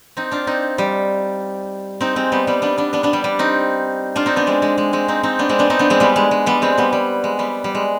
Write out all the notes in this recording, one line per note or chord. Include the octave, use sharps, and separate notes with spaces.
C4 D#4
D4 F4
C4 D#4
G3
C4 D#4
G#3 C4
G3 B3
G3 B3
B3 D4
B3 D4
B3 D4
B3 D4
G3
G3
C4 D#4
D4 F4
C4 D#4
B3 D4
G#3 C4
G#3
G#3
G#3 C4
C4 D#4
C4 D#4
B3 D4
G#3 C4
B3 D4
C4 D#4
B3 D4
G#3 C4
G3 B3
G#3
G#3
G3 B3
G#3 C4
G3 B3
G3
G#3
G3 B3
G3
G#3